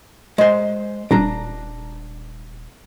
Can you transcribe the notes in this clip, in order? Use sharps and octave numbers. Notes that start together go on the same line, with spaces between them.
G#3 C5
D#1 D4 A#5